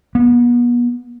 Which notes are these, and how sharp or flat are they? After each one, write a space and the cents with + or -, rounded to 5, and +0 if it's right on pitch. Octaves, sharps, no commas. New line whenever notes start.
B3 -35